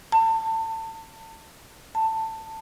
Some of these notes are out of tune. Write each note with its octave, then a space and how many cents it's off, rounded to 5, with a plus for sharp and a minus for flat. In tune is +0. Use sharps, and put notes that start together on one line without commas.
A5 +30
A5 +15